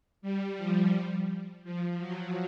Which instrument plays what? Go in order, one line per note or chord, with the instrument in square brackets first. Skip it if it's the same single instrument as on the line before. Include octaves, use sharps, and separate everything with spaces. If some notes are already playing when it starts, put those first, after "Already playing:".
[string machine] G3
F3
F3
F#3